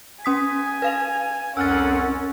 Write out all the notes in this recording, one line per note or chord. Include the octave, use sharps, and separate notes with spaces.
C#4 G#5 D#6 B6
B4 F5 F7
C2 F2 C#4 A#4 F#5 E6 F6 A6